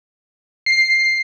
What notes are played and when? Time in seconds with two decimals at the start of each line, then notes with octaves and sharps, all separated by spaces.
0.66 C7